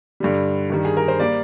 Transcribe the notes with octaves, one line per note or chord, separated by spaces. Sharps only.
G2 D3 G3
G2 D#3 G3
G#4
A#4
C5
G3 A#3 D5